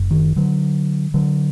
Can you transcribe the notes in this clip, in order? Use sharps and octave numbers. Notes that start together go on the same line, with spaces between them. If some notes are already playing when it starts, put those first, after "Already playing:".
Already playing: F#1 F#2
D#3
D3 F#3
D3 F#3